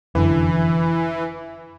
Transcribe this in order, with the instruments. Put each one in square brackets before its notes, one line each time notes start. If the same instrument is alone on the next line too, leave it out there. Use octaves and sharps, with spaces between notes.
[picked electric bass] F1 F#2 D3 [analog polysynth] E3